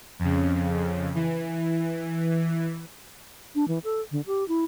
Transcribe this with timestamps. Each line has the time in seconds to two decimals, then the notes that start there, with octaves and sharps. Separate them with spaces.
0.19 F2 C#3
1.15 E3
3.55 D4
3.68 E3
3.84 A4
4.12 D3
4.27 G4
4.48 E4